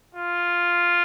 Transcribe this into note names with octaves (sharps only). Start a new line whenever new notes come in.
F4